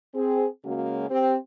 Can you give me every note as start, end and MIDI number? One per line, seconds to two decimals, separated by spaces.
0.14 0.46 60
0.14 0.46 68
0.65 1.06 49
0.65 1.06 56
0.65 1.06 58
0.65 1.06 61
0.65 1.06 66
1.10 1.35 60
1.10 1.35 67